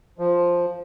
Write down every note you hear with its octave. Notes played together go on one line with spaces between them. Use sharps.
F3